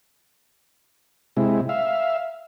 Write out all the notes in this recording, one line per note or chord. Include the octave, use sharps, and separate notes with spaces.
C3 G#3 E4
E5 F5